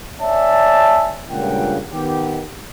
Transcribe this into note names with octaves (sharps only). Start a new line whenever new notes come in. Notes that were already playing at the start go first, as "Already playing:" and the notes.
C#5 D5 E5 G#5 A5
C#2 G2 A#2 C#3 F#5 G5
D#3 B3 G4